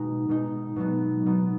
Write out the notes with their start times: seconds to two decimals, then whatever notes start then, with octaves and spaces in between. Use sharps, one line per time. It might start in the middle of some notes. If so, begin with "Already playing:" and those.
Already playing: B2 G#3 D#4
0.29 B2 G#3 D#4
0.76 B2 F#3 B3 D#4
1.26 B2 F#3 B3 D#4